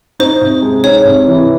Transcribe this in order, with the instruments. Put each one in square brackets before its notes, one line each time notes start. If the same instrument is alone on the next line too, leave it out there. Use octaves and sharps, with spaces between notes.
[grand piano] D#4 [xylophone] C5
[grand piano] C3
G#3
[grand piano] D#4 [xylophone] C#5
[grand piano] C3
E3